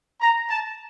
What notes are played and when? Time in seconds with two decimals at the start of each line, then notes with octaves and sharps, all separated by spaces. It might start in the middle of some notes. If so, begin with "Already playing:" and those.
0.21 A#5
0.49 A5